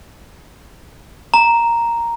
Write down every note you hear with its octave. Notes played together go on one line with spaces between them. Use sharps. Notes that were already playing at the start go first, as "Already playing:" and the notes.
A#5